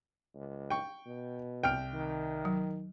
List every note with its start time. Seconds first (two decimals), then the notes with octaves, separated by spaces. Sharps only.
0.35 C#2
0.70 G5 C#6
1.06 B2
1.63 C2 G5 F6 D7
1.94 D#3
2.45 F#3